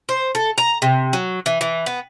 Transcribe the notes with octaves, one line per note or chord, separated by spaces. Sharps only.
C5
A4
A#5
C3
F#3
E3
E3
B3